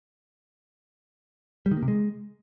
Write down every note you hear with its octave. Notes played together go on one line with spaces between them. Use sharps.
G3
D#3
A#3
C3
G#3